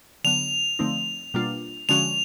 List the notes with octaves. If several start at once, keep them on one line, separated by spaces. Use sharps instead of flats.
D3 F#3 B3 F7
D3 F3 A3 C4 D#4
B2 G3 A#3 D4 F4
D3 F3 G#3 C#4 F#4 F7